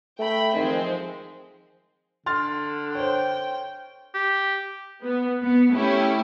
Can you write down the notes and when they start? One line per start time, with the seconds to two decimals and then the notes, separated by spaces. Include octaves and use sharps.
0.19 A3 G5 B5
0.55 D#3 F3 G#3 C4
2.26 D3 C6 F6 A6
2.95 C5 C#5 G5
4.14 G4
5.05 B3
5.43 B3
5.74 A3 C#4 E4 G4